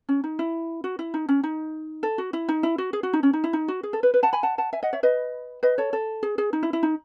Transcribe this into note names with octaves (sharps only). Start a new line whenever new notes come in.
C#4
D#4
E4
F#4
E4
D#4
C#4
D#4
A4
F#4
E4
D#4
E4
F#4
G#4
F#4
D#4
C#4
D#4
E4
D#4
F#4
G#4
A4
B4
B4
F#5 A5
G#5 B5
F#5 A5
F#5 A5
E5 G#5
D#5 F#5
C#5 E5
B4 D#5
B4 D#5
A4 C#5
A4
G#4
G#4
D#4
E4
E4
D#4